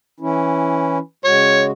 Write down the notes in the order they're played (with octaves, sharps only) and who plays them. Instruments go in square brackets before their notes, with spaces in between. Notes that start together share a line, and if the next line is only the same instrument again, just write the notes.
[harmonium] E3 C#4 E4
[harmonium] C#3 G#3 F#4 [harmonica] C#5